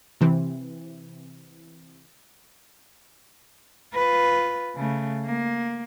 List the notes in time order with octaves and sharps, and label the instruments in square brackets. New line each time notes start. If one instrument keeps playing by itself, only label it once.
[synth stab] C3 E3 C4
[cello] F4 B4
C#3 A3
A#3